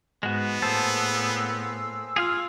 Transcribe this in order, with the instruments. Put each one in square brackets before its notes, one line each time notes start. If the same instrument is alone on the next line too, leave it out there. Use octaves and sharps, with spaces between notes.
[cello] G#2 [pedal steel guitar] G#3 F#4 [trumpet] B3
[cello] A2 A#3 [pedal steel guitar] G#4 C5 A5 [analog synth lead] E6
[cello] F4 [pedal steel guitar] G#4 F5 F6